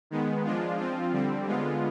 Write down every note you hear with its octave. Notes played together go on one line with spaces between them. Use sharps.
D#3 G#3 B3
F3 G#3 D4 F4
F3 C4 F4
D3 G3 C4
D3 G#3 B3 F4